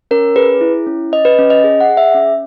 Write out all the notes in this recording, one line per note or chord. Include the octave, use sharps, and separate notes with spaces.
C#4 A#4
G#4 B4
E4
C#4
C#4 D#5
B4
C#4
D#5
G#4
F#5
G#4
E5
C#4